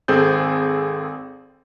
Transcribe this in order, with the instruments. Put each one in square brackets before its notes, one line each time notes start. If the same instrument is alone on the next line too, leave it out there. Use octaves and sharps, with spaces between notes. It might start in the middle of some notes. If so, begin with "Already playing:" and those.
[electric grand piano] G#1 C4 G#4 A4 G6